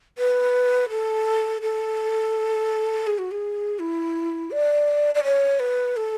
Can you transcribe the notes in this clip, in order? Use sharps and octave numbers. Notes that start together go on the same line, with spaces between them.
B4
A4
A4
G#4
F#4
G#4
E4
D5
D5
C#5
B4
A4